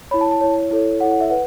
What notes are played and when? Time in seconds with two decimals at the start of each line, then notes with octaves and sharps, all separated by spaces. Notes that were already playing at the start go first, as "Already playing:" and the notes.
0.11 C#5 B5
0.14 E4
0.21 A5
0.31 A5
0.41 E4 C#5
0.71 E4 A4 C#5
1.00 E4 A4 C#5 F#5
1.11 F#5
1.21 E5
1.30 B4 F#5